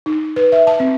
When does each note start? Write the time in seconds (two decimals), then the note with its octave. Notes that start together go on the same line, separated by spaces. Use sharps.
0.06 D#4
0.36 B4
0.52 E5
0.67 A5
0.80 C4